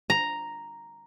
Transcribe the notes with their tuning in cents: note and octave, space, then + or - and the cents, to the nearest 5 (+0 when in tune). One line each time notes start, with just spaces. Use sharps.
A#5 +0